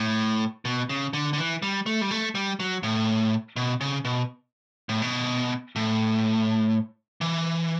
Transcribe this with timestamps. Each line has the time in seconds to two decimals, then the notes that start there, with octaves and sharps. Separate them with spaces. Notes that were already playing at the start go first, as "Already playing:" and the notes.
Already playing: A2
0.65 B2
0.89 C#3
1.13 D3
1.33 D3
1.38 E3
1.62 G3
1.86 A3
2.01 G3
2.11 A3
2.35 G3
2.60 F#3
2.83 A2
3.56 B2
3.81 C#3
4.05 B2
4.89 A2
5.02 B2
5.76 A2
7.21 E3